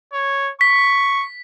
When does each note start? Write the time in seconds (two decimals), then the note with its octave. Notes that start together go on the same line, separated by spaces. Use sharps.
0.13 C#5
0.61 C#6 B6